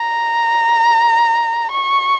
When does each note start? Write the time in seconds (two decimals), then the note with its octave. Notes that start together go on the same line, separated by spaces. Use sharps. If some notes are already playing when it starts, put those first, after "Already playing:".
Already playing: A#5
1.71 C#6